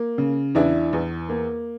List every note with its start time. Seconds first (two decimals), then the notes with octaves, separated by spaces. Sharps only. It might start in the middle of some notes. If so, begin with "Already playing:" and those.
Already playing: A#3
0.18 C#3
0.55 E2 D4 E4
0.93 E2
1.29 A#3